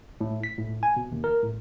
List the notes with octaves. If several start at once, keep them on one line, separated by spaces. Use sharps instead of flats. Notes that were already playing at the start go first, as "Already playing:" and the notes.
A2
B6
A2
G#5
B2
D#2
A#4
A2